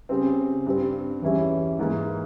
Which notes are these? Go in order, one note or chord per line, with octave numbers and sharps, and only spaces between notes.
C#3 G3 C4
G2 G3 C4
E2 E3 G3 C#4 E4
G#2 E3 A#3